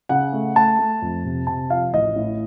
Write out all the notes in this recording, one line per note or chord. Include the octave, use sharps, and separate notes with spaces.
C#3 F#5
A3
A3 A5
A3
F2
C3
C3 A5
F3 F5
A1 D#5
A2